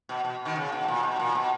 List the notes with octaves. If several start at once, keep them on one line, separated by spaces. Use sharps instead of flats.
B2
B2
B2 D#3
C#3
B2
A#2
B2
A#2
B2